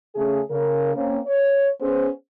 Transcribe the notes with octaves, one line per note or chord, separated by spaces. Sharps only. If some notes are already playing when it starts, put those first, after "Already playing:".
C#3 A3 C#4 G#4
C#3 A#4
A#3 C4 C#4
C#5
B3 C#4 G#4 C5